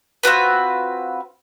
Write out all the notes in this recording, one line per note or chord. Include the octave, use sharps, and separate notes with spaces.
C4 F4 F#4 B4